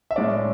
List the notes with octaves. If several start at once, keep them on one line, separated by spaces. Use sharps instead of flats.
E5
A2 G#3 C#4 D5